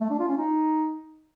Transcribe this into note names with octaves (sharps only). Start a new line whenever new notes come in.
A3
D4
F4
C#4
D#4